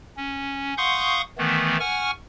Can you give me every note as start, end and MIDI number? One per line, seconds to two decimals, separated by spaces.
0.17 0.74 61
0.78 1.22 77
0.78 1.22 78
0.78 1.22 84
0.78 1.22 85
0.78 1.22 87
0.78 1.22 91
1.38 1.77 51
1.38 1.77 52
1.38 1.77 57
1.38 1.77 59
1.80 2.11 78
1.80 2.11 80
1.80 2.11 85
1.80 2.11 89